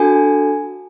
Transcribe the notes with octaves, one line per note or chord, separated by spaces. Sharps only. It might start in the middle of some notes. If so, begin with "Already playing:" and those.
Already playing: D4 F#4 A4 G#5